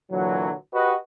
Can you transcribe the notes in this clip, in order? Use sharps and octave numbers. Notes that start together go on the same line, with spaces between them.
A#2 D3 E3 F#3
F#4 G4 B4 D#5